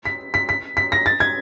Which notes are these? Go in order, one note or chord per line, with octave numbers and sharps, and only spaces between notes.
B6
B6
B6
B6
A#6
A6
G#6